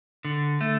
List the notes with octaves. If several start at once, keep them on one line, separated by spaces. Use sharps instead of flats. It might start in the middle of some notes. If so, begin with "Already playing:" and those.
D3
A3